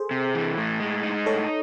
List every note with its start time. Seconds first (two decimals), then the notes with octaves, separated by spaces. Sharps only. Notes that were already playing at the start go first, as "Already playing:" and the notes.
Already playing: G#4 A4 C5
0.11 C3
0.35 E3
0.58 A2
0.80 G#3
1.03 D#4
1.26 A2 A4 C#5